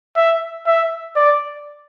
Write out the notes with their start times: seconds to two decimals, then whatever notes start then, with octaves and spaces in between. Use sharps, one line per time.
0.16 E5
0.66 E5
1.16 D5